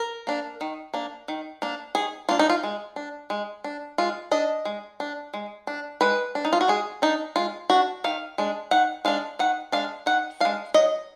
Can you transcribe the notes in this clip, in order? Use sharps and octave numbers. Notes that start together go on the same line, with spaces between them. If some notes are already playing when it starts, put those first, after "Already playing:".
Already playing: A#4
A#3 D4
D#3
A#3 D4
D#3
A#3 D4
D#3 G#4
A#3 D4 F4
D#4
F4
G#3
D4
G#3
D4
G#3 F4
D4 D#5
G#3
D4
G#3
D4
G#3 B4
D4
D#4
F4
F#4
G#3 G#4
D4 D#4
G#3 F4
D4 F#4
D#3 F5
G#3 D4
D#3 F#5
G#3 D4 F5
D#3 F#5
G#3 D4 F5
D#3 F#5
G#3 D4 F5
F#3 D#5